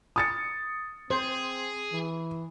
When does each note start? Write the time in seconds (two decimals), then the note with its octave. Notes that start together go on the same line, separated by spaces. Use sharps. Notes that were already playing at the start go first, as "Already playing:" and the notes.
0.16 D#6 A6 C#7
1.10 C4 G#4 C5
1.92 E3